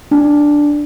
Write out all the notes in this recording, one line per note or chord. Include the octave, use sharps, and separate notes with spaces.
D4